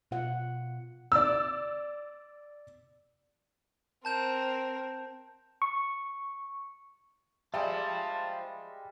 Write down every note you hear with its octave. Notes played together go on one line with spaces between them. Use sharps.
B2 F4 F#5
D5 E6
C4 A#4 A5 G6 E7
C#6
G3 G#3 F4 C5 E5 A5